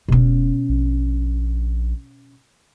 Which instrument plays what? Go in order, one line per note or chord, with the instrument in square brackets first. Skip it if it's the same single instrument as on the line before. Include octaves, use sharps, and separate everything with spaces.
[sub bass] E1 [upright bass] B2 C#4
[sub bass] A#1